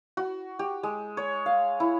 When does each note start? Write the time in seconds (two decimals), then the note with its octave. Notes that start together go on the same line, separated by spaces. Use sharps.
0.17 F#4
0.59 G4
0.83 G#3
1.17 C#5
1.46 F5
1.80 E4